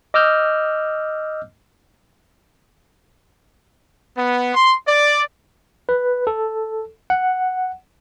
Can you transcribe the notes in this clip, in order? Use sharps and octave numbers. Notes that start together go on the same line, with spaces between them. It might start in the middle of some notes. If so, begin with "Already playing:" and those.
D#5 D6 E6 F6 G6
B3
C6
D5
B4
A4
F#5